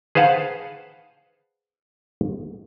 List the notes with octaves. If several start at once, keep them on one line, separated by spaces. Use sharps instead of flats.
G#4 B4 C5 F5 F#5 A5